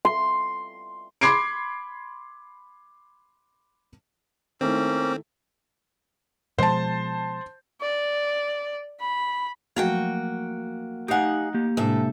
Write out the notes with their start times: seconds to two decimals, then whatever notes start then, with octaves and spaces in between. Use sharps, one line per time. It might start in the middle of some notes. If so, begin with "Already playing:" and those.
0.05 C6
1.21 B5 C6 D6 G#6 C7 D7
4.61 D#3 A3 A#3 C4 C#4 E4
6.59 B2 F3 G#3 C5 A5
7.81 D5
9.00 B5
9.76 F3 F#3 A3 A#3 F#4 G5
11.08 A3 D#4 G4 F5 F#5 G#5
11.54 A#3 G4
11.77 A2 C3 G#3 D4 A4 E5